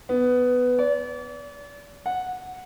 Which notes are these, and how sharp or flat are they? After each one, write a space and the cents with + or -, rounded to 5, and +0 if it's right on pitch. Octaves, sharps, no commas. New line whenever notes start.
B3 +10
D5 -40
F#5 -10